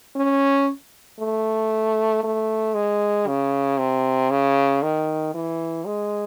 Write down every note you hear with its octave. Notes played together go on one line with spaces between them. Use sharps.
C#4
A3
A3
G#3
C#3
C3
C#3
D#3
E3
G#3